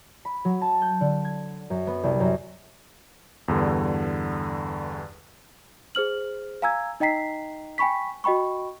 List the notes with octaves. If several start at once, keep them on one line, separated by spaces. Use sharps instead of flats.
B5
F#3
A5
G6
D3
G#6
F#2
B3
C2
F#2
E2 G2 D3
G#4 C5 F6 F#7
F5 G#5 A#5 E6 G#6
D#4 D#5 G5 A#5 B6 C7
G5 G#5 B5 C#6 B6
F#4 D#5 G5 B5 C#6